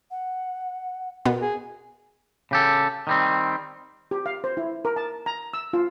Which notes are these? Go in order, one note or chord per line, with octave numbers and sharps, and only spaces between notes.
F#5
B2 B3 A#4
G#4
C#3 G4 A4
D#3 G3 C4
G4
F5
C5
E4
A#4
A5
A#5
E6
F4